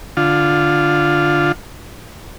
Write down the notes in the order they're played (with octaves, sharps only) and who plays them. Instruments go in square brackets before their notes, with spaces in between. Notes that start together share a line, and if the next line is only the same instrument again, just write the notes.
[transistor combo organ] D3 F4